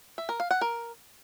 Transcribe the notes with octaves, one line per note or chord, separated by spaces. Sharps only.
E5
A#4
F5
F#5
A#4